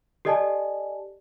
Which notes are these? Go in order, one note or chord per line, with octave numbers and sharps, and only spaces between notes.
G4 A4 D5 D#5 G#5 A5